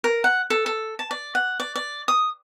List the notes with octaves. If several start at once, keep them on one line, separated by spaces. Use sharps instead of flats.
A#4
F#5
A4
A4
A5
D5
F#5
D5
D5
D#6